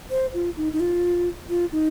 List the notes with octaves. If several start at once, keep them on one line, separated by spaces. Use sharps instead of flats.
C5
F4
D#4
D#4
F4
F4
D#4